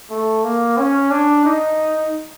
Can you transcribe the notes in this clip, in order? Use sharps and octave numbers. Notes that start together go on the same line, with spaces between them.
A3
A#3
C#4
D4
D#4